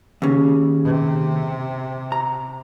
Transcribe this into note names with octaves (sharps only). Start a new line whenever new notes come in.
D#2 C#3
C3
A#5